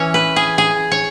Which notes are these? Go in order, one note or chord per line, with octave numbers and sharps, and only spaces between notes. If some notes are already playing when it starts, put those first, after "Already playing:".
Already playing: E3 C#4 C#5
B4
G#4
G#4
C#5